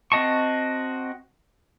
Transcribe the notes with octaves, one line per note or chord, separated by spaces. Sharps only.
C4 F#4 D#5 A5 C#6